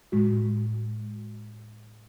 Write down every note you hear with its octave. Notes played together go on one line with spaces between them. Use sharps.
A2 G#3 F#4